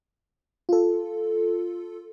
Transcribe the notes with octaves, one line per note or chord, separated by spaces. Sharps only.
F4 A4